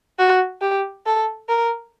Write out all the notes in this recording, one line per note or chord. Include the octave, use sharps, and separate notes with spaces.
F#4
G4
A4
A#4